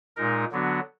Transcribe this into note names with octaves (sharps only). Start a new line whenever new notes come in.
A#2 G#3 D#4 A#4
D3 F#3 B3 D4 F#4